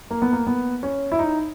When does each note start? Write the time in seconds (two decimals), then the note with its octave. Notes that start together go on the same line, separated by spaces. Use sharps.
0.11 A#3
0.22 B3
0.32 A#3
0.47 B3
0.83 C#4
1.12 E4
1.19 D#4